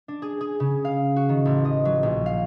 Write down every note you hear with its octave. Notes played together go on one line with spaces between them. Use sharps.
D4
G#4
G#4
C#3
F5
F#4
D#3
A1
D#5
F#3
A#1
F5